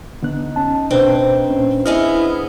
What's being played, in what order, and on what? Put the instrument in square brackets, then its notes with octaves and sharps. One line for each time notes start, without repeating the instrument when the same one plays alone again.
[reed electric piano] D3 B3 F#6 [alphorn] D#4
[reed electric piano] C#4 A5
[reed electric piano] B2 [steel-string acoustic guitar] C4 [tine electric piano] D4 B4 C5
[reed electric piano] A#2 C#4
[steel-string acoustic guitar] B3 G#4 D#5 [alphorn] E4 [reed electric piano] F6